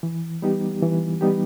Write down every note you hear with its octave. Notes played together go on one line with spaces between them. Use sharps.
E3
G3 B3 D#4 G4
E3
G3 B3 D#4 G4